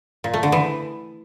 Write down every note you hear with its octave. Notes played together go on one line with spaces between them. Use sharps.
A#2
A3
D3
E3